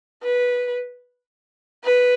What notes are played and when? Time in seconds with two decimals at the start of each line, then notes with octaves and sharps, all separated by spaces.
0.23 B4
1.84 B4